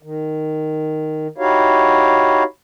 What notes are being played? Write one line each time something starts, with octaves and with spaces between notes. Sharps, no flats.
D#3
D#4 E4 F#4 G4 C#5 F5